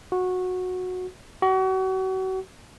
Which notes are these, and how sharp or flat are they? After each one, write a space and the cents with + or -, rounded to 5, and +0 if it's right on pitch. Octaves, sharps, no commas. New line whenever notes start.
F#4 -15
F#4 +35